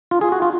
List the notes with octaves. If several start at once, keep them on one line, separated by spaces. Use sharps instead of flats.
F4
G#4
F#4
F4